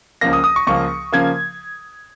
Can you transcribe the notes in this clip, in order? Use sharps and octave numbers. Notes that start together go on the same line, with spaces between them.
C#2 C#3 F3 A#3 A#6
D#6
D#6
C#6
C#2 C#3 F3 A#3 C#6
C#3 F3 A#3 G#6